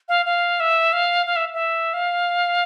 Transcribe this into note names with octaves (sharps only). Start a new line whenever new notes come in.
F5
F5
E5
F5
F5
E5
E5
F5